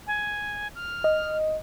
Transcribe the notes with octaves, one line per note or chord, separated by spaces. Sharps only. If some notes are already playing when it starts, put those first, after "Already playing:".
G#5
F6
D#5